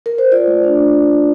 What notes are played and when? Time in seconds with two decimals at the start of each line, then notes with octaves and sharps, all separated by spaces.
0.06 A#4
0.18 C5
0.32 F4 D5
0.47 A3
0.64 D4